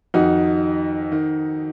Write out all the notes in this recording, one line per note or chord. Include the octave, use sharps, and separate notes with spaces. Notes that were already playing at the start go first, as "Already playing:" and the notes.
F2 D#3 D#4 F#4
D#3